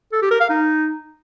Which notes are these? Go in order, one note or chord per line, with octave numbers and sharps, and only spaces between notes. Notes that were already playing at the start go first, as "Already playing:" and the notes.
A4
G4
A#4
F5
D#4